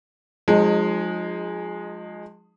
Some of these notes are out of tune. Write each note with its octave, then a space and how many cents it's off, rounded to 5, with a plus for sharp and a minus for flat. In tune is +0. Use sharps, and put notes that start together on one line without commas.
F3 +35 G#3 +0 D#4 -15